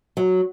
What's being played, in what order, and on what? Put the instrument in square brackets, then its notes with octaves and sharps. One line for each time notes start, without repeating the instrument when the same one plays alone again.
[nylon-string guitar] F#3